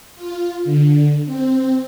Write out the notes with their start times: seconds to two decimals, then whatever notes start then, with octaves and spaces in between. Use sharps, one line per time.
0.16 F4
0.65 D3
1.26 C4